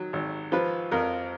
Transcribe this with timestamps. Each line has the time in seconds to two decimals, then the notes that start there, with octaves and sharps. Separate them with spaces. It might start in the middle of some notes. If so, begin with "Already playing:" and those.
Already playing: D#3 F#3
0.13 G#1
0.52 F3 B4
0.91 F2 A#4